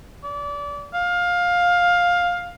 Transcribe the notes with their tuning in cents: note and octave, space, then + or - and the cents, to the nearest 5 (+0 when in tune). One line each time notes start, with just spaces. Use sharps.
D5 -30
F5 +15